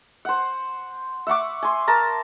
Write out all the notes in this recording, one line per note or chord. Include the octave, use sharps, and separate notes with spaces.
C5 F#5
E5 F#5 C#6 D6
G#5 C6
A#4 A5 A#5